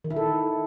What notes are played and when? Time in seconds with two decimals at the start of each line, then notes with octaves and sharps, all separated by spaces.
0.04 D#3
0.10 E4
0.17 A4